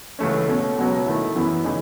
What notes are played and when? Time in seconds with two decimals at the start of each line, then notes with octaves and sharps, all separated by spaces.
0.19 C#2 C#3 E3 A3 C#4
0.48 B2 A3 C#4
0.78 C#2 B2 F#3
1.06 D#3 A3 E4
1.35 F#2 E3 B3 E4
1.64 C#3 E3 A3 D#4